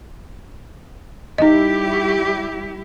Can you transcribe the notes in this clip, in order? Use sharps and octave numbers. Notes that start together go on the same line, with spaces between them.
G3 D#4 E4 G4 D#5